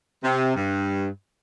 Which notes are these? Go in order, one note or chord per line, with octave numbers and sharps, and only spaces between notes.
C3
G2